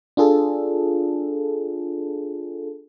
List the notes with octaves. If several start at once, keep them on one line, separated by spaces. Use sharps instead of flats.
D4 F4 G#4 A4